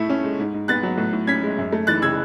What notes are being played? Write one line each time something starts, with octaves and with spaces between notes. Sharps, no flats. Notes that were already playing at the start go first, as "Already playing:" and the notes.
Already playing: A2 A3 E4
C#4
G#3
G#2
G#2
B3 F#6 A6
F#3
A2
A2
C#4 G#6 B6
G#3
F#2
A3
E3 F#6 A6
C#3 E6 G#6